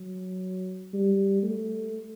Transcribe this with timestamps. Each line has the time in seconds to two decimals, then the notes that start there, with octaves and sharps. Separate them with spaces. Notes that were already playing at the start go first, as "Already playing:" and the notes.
Already playing: F#3
0.94 G3
1.43 A3